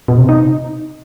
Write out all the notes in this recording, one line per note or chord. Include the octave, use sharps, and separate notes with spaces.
B2
C3
D#4